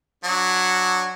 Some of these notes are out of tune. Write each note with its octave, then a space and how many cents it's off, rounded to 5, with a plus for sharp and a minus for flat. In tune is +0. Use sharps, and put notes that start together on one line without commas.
F#3 -5 D4 +0